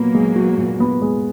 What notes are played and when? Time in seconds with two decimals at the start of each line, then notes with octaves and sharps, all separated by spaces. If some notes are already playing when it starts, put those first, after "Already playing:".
Already playing: A#2 F#3 A#3 B3
0.15 G#3
0.36 F#4
0.58 A#2
0.80 B3
1.02 G#3